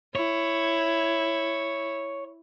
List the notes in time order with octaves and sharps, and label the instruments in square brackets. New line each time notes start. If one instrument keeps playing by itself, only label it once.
[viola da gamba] E4 [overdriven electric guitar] C#5